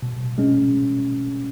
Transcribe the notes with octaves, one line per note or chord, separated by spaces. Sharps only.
B2
G#3 C#4